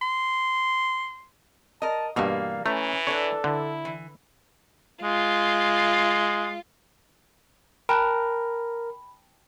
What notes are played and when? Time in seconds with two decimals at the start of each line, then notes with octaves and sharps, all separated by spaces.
0.02 C6
1.82 A#4 D#5 A5
2.16 G2 B2 E3 G3 A#3 F5
2.66 E3 A3 C#4 A#5
3.07 D4 A4 B4 C#5
3.44 D3 E4
3.85 E3
5.03 G#3 F4
7.89 A#4 G5 A5 B5 F#6